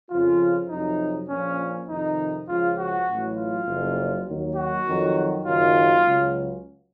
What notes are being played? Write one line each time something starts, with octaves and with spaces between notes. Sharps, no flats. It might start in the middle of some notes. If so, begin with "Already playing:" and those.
F2 C#3 F3 F4
F2 C3 F#3 D#4
A#1 A#2 F3 C#4
F2 C3 D#3 D#4
C#2 C#3 F3 F4
F#4
A1 A2 F#3
F4
F#1 F2 C#3 F#3
D#2 D#3 F#3
F#4
F2 D#3 F#3
F#1 F#2 D#3 F#3 F4
C#2 C#3 F#3